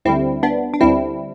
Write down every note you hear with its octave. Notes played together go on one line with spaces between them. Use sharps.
D2 D3 G3 C4 E4
B3 D4
D4
D2 D3 G3 C4 E4